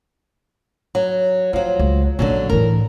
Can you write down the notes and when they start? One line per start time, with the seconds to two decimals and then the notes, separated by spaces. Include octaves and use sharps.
0.95 F#3
1.53 F3 F#3 F4
1.79 C#2
2.19 A#1 D3 F#3 C#4
2.49 A2 E3 A#4